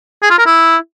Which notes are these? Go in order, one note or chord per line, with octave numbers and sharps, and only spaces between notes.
G#4
F4
A#4
E4